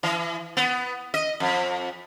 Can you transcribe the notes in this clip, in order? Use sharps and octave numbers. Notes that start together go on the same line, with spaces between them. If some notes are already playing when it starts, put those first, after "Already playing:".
E3
B3
D#5
F2